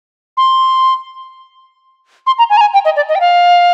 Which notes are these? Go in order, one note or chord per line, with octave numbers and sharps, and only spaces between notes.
C6
C6
A#5
G#5
A#5
G#5
G5
D#5
D5
D#5
G5
F5